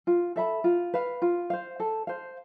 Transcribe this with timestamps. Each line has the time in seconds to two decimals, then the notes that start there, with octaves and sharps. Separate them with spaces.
0.07 F4
0.36 A4 E5 B5
0.64 F4
0.94 B4 F5
1.22 F4
1.50 C5 F5
1.80 A4
2.07 C5 F5